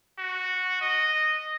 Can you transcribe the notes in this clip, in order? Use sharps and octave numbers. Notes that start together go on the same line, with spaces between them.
F#4
D#5